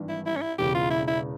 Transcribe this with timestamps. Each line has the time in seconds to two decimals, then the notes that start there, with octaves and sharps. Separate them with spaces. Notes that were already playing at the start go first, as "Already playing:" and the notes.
Already playing: G#1 G2 E3
0.09 E4
0.26 E4
0.36 C#4
0.42 E4
0.58 E1 E2 C#3 G4
0.75 F4
0.91 E4
1.07 E4